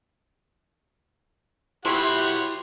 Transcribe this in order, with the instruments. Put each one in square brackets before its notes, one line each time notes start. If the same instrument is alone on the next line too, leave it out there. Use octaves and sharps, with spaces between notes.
[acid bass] E4 [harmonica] F#4 G4 F#5 [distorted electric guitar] B4 C#5 [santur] C6